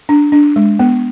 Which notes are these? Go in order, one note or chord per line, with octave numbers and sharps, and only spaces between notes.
D4
D4
G#3
B3